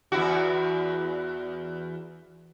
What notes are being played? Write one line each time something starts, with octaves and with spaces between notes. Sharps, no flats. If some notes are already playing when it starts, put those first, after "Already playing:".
E2 E4 F#4